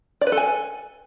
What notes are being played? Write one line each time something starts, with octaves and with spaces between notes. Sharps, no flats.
D5
B4
A4
G#5